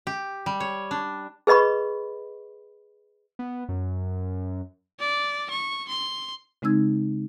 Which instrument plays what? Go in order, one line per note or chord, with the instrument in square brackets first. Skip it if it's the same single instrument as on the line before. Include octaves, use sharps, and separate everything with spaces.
[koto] G4
G3
C#5
D4
[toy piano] G#4 B4 D#5 B5 C#6
[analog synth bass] B3
F#2
[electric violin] D5
C#6
C6
[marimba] C#3 G#3 C4 D#4 E6 G#6